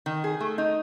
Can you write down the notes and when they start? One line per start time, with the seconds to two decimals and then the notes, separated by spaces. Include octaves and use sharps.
0.06 D#3
0.24 G#4
0.40 A3
0.58 D#4